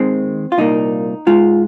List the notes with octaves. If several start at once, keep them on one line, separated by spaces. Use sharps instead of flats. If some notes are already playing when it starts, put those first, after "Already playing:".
Already playing: D#2 D#3 G#3 C4
F4
C2 A#2 A#3 D#4
G#2 G#3 F4